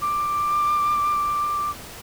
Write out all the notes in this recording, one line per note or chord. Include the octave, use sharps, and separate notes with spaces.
D6